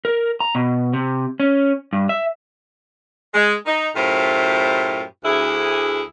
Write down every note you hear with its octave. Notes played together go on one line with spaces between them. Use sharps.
A#4
A#5
B2
C3
C#4
G2
E5
G#3
D#4
F#2 A2 E4 F4 G4 C5
D2 E4 G#4